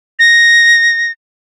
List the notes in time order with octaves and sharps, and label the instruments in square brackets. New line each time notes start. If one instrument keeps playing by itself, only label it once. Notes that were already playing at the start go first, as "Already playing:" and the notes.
[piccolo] A#6